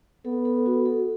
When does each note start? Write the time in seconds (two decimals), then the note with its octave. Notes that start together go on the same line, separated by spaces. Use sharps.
0.25 B3 A4
0.45 A4
0.66 F#4
0.85 A4